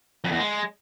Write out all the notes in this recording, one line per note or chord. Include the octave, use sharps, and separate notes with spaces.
F2
E2
G#3